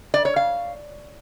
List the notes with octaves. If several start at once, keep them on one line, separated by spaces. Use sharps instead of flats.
D5
C#5
F5